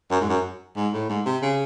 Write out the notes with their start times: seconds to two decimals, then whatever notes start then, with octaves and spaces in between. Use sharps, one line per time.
0.11 F#2
0.21 G#2
0.29 F#2
0.76 G#2
0.93 A2
1.09 G#2
1.26 C3
1.42 C#3